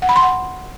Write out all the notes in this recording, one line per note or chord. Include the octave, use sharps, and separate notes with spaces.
F#5
B5
C6
F#5